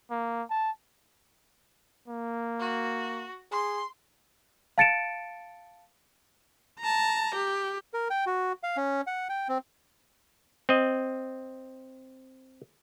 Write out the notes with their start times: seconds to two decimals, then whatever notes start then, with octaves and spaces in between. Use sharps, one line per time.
0.11 A#3
0.50 A5
2.08 A#3
2.59 F#4
3.52 G#4 C6
4.78 F5 A5 A6 C#7 D7 E7
6.80 A5 A#5
7.34 G4
7.94 A#4
8.10 G5
8.26 F#4
8.63 F5
8.77 C#4
9.07 F#5
9.29 G5
9.49 C4
10.69 C4 D#5